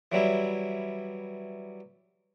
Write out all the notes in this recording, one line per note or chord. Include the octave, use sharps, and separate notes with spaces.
E3 F#3 G3 E4